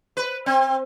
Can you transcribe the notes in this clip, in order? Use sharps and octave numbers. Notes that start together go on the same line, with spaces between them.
B4
C4